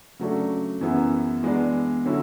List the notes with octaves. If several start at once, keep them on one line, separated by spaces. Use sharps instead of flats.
C#3 F#3 A3 D4
F#2 E3 B3 E4 G#4
E3 G#3 B3 D4
D3 F#3 C#4 E4